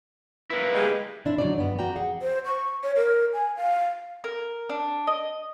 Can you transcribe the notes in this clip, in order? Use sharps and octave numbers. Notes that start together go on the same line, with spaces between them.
A#3 E4 B4
G3 G#3
C4 D4 E4
D3 F#3 D4 D#4 D5
G2 B3
F2 F#4 D5 G5 A#5
G#4 F#5
C5
C#6
C#5
A#4
G#5
F5
A#4
D4
D#5